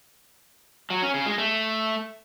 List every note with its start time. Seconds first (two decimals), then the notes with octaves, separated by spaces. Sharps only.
0.90 F#3
1.02 C#4
1.14 C#3
1.26 G#3
1.38 A3